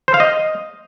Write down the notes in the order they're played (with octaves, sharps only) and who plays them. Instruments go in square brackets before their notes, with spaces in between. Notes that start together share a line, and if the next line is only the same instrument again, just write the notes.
[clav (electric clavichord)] C5
F5
D#5